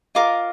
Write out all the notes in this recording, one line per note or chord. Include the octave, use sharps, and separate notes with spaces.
F4 A#4 D#5 D6